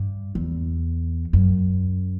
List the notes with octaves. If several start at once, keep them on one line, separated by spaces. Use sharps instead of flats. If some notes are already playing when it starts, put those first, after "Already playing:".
Already playing: G2
E2
F#2